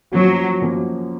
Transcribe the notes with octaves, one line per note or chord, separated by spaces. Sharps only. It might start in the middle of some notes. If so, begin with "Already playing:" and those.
F#2 F3 F#3 A#3 C#4 F#4
F#2 F3 A#3 C#4 F#4